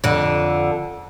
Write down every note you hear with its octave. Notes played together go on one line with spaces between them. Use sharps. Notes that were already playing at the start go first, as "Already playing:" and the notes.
F2 D3